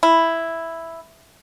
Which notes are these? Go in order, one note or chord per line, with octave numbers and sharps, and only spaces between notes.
E4